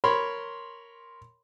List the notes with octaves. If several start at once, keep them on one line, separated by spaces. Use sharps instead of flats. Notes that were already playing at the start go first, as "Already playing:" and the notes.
A#4 C#5 B5 C6